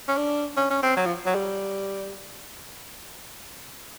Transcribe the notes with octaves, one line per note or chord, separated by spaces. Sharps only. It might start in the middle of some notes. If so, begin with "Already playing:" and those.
C#4
D4
C#4
C#4
C4
F#3
F3
F#3
G3